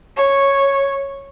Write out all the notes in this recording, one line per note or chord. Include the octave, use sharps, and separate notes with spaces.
C#5